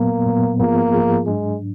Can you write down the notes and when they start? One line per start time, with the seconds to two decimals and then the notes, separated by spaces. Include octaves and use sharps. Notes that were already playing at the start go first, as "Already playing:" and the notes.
Already playing: A#2 F#3 A#3 B3
0.26 A#2 F#3 B3
0.60 G#2 F3 A#3 B3 F4 G#4
0.94 G#2 F3 B3 F4 G#4
1.27 G#2 F#3 G#3 D4